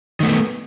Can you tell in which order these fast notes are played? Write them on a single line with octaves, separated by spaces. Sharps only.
D#3 A3 B3